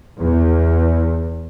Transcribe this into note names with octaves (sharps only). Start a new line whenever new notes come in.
E2